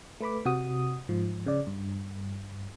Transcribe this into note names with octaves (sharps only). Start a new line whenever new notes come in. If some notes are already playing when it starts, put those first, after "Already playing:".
A3 B4 B5 D6
C3 F#4 D#6
G#2 F3
C#3 D5
G2